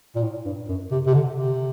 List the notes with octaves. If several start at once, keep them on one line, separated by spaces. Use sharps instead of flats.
A#2
A2
G2
F#2
C3
C3
D3
C3